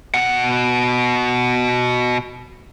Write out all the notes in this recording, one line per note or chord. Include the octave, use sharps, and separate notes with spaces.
B2 F#5